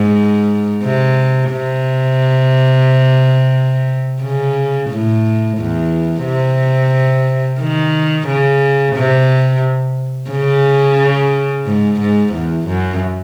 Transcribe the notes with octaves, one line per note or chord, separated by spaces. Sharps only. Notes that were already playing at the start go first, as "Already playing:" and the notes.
Already playing: G#2
C3
C3
C#3
A2
E2
C3
D#3
C#3
C3
C#3
G#2
G#2
E2
F#2